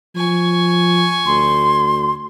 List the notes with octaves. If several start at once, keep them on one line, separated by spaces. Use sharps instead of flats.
F3 G#5 C#6
D2 C6